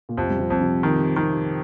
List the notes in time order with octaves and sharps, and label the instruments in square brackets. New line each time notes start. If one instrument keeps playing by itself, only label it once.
[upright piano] A#2
[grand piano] F2 [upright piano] C3
[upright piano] G3
C3 F3
[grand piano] F2
[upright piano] C3 F3
[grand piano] D#3
[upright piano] C3
[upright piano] C3 [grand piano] D#3
[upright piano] C3